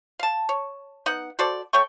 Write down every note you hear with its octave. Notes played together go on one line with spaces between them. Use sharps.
F5 A5
C#5
B3 D#4 F#5
F#4 A4 C5 D5
A3 C#5 G5 C#6